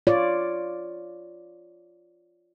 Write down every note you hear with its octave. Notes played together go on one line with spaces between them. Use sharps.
F4 C#5 D5